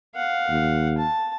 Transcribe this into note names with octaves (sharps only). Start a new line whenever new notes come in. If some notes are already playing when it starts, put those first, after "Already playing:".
F5 F#5
D#2
A5